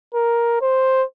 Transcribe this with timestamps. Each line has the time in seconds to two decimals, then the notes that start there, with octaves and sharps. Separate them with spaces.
0.14 A#4
0.62 C5